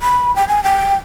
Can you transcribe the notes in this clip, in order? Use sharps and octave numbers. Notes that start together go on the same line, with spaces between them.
B5
G5
G#5
G5